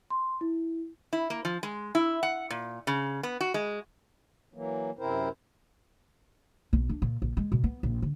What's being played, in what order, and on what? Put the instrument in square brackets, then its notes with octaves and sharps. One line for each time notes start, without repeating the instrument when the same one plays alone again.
[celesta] C6
E4
[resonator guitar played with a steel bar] E4
A#3
F3
G#3
E4
F#5
A#2
C#3
B3
F#4
G#3
[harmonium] E3 F#3 A#3
F#2 C3 C4 E4 A#4 C5
[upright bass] B1
D4
A#2
A#1
G#3
B2
B3
A#1
D3